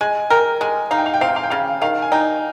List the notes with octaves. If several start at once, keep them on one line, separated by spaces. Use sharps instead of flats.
G#3 G#5
A#4 G5
G#3 G#5
D#4 F5
G5
F5
G5
C4 F5
G5
F5
G5
C#3 F5
D#3 F5
G#5
D#4 G5